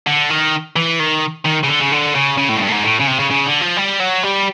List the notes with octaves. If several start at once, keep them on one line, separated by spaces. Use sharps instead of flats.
D3
D#3
E3
D#3
D#3
C#3
D3
C#3
D3
C#3
C#3
A2
G#2
G2
A2
G#2
A2
C#3
C3
C#3
C#3
D3
F3
G3
F#3
G3